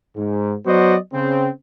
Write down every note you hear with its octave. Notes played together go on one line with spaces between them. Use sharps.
G#2
F#3 B3 F#4 C5 D5 D#5
C#3 C4